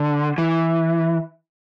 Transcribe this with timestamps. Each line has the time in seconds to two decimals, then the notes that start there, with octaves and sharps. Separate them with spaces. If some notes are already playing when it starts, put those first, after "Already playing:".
Already playing: D3
0.38 E3